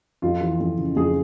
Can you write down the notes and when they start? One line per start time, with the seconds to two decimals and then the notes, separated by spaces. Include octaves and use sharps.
0.22 F2 F4
0.41 E3
0.60 F2
0.78 C#3
0.96 F2 G#4